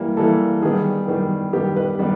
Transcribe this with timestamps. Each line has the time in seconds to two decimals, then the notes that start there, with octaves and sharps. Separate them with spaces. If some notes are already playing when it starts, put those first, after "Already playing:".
Already playing: E3 G3 A#3
0.17 E3 G3 A#3 A4
0.62 D#3 G3 B3 G#4
1.08 D#3 G3 B3
1.53 D#3 G3 B3 G4
1.76 B4
1.99 D#3 G3 B3